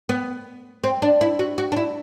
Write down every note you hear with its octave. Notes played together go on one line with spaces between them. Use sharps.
B3
C4
D4
E4
F#4
F#4
D4
E4